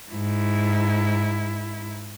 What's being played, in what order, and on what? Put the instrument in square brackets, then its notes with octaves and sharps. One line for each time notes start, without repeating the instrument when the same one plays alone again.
[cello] G#2 E4